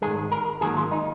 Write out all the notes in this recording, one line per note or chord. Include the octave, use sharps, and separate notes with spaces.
G#2 D#3 G#3 G#4
A#4
G#2 D#3 F#3 A#3 G#4
F4
D#4